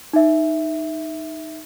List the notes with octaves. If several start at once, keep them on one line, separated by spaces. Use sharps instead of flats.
D#4 E5